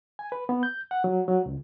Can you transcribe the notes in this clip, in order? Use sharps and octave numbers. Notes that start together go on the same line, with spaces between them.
G#5
B4
B3
G6
F#5
F#3
F#3
C#2